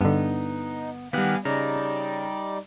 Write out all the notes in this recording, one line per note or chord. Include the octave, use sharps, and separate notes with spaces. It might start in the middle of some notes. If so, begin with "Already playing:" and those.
G2 D3 B3 D#4
D#3 G3 B3 G4 F5 F#5 G#5
C#3 G3 D#4 D5 A#5